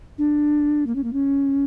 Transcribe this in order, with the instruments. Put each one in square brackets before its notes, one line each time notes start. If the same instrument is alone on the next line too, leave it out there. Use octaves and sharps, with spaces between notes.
[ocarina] D4
A#3
C#4
A#3
C#4